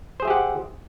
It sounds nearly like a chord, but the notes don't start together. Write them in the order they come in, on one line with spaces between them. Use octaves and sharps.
C5 G#4 E5 G4 F#5